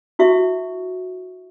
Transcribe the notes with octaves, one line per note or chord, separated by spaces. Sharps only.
E4 F#4 E5 C#6